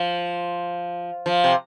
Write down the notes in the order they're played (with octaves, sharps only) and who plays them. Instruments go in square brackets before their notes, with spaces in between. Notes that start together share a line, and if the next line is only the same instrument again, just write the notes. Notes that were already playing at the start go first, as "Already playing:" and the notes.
Already playing: [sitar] F3
F3
C3